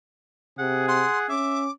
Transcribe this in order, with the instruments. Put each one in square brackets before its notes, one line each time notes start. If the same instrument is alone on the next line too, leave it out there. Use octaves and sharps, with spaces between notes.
[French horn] C3 [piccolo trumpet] G#4 [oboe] F#5
[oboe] F#5 [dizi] C6
[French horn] C#4 [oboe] E5 [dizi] D6